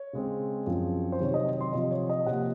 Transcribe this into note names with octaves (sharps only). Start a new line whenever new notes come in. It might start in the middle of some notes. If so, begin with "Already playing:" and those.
Already playing: C#5
C#3 G#3 C4
F#2 F3 C4
C5
C3 D#3 F#3 C4 C#5
D#5
C6
C3 F3 C4 D#5
C#5
D#5
C3 F3 A#3 F#5